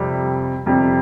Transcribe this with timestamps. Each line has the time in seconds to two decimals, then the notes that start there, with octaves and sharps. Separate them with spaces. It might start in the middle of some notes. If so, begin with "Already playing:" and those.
Already playing: F2 C3 G3
0.66 F2 C3 G3